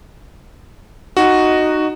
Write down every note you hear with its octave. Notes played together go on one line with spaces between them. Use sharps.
D#4 F#4